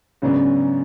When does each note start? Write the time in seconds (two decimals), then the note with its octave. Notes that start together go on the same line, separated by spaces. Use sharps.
0.22 G#2 C#3 F#3 B3 D4